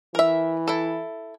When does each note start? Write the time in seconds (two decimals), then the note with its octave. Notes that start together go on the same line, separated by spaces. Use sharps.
0.15 E3 A#4 E5
0.68 E4 A4